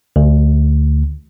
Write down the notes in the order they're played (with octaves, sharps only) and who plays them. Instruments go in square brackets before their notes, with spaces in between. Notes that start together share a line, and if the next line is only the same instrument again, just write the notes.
[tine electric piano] D2